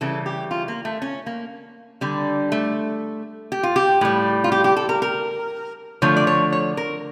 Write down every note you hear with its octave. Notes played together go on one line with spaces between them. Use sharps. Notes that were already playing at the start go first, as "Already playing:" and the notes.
C#3 E3 G3 A4
G4
F4
A#3
A3
C#4
A#3
D3 G3
A3
G4
F4
G4
A2 G3
F4
G4
G4
A4
A#4
A#4
D3 F3 A3 C#5
D5
C#5
C#5
A#4